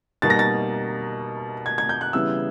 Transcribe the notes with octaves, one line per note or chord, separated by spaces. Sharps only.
B2 G3 A#3 D#4 A6
A#6
A6
G#6
G#6
G6
F#6
C#3 E3 G3 B3 E4 E6